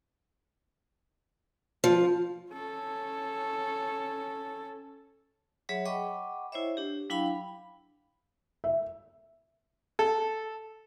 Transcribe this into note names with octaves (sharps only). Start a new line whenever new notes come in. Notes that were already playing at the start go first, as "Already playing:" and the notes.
F3
C#4 A4
F#3 G#4 C#5 E5 F#5
D#5 F#5 G5 B5 C#6 D6
E4 C5 C#5 E5
D4 G4
F#3 D4 E4 F5 G5 B5
B5
E5
A4